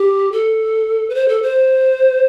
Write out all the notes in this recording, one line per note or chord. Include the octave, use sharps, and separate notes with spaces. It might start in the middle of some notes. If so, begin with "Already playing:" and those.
Already playing: G4
A4
B4
C5
A4
C5